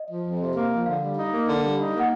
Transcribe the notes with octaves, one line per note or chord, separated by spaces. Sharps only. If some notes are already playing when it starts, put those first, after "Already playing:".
Already playing: D#5
F3
F2
C3
A#3
F3
D3 F5
G3
D#4
A#3
D3
G3
D#4
A#3
F#5